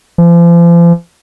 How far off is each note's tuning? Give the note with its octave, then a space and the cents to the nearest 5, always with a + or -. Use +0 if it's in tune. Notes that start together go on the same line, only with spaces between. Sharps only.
F3 -40